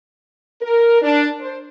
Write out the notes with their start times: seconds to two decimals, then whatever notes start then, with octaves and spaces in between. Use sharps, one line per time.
0.62 A#4
1.02 D4
1.40 C5